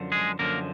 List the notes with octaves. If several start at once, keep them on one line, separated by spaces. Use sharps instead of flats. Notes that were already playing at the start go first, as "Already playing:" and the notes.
Already playing: F#2 D3 F3
G#3 G#4
F#2 D3 F3 A#3 A#4